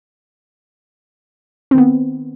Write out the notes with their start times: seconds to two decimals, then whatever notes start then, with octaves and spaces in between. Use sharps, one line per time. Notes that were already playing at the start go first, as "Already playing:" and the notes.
1.71 C4
1.75 D#3
1.78 B3